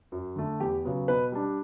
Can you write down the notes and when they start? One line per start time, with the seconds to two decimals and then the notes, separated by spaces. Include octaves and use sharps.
0.12 F#2
0.36 D3 A3
0.60 E2 G4
0.84 C#3 F#3 B3
1.08 B2 B4
1.32 G3 D4